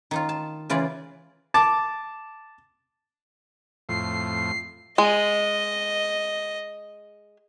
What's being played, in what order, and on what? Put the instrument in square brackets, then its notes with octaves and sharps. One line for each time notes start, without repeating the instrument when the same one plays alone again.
[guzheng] D#3 D#4 F4
A5
C#3 E3 F4 D5
[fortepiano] A5 D6
[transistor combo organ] F2 A2 [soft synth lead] C7
[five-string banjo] G#3 [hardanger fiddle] D#5